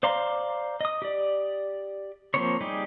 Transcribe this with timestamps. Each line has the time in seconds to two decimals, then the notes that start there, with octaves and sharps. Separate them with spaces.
0.03 C5 D5 F5 A#5 C6
0.81 D#5 D#6
1.02 G4 D5
2.34 F3 A#3 C4 C5 C#5
2.61 G3 D#4 G4 G#4